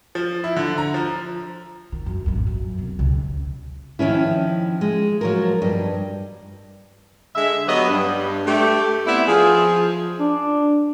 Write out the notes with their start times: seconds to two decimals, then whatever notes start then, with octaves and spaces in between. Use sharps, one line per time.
0.15 F3
0.44 E4
0.56 D3
0.78 A#5
0.94 F3
1.92 D#3
2.06 F#2
2.26 A1 F2
2.47 F#2
2.79 E1 C2
2.99 C#2 C#3
3.99 D#3 F3 C4 C#4 E4
4.81 G#3
5.21 F3 F#3 A#4
5.62 G2 D#5
7.35 D3 G#3 E5
7.67 F#3 B3 G4 B4 C#5 D#5
7.88 G2
8.46 A3 G4
9.07 B3 C4 D4 E4
9.27 F3 G#4
10.19 D4